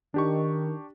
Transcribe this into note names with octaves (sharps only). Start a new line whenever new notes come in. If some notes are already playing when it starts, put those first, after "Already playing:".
D#3 D4 G4 C#6